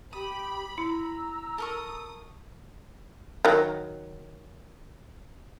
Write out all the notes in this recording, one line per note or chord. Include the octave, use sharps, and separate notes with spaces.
G4 B5 D#6
E4 A#5 E6
A4 A#4 C#6 D#6
D#3 F#3